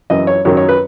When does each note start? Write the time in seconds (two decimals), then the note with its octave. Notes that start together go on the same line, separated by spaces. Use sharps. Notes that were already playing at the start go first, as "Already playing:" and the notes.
0.10 F#2 E3 D#5
0.27 C#5
0.45 F#2 D#3 F#3 C#5
0.57 C#5
0.69 B4